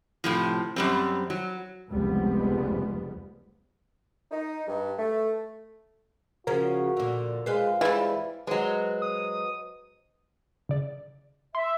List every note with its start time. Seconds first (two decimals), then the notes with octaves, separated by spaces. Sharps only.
0.24 A2 C3 F3
0.76 F#2 G3 C4
1.30 F#3
1.91 F1 C#2 F3 G3 G#3 B3
4.32 D#4
4.68 G2
4.99 A3
6.47 C#3 F3 C#4 F#4 A#4
6.97 A#2 D3
7.46 G#3 F4 B4 C5
7.81 E3 G3 G#3 E4 F5
8.47 F#3 G#3 B4 C5 D#5
9.02 D#6
10.69 C#3 D5
11.55 E5 C6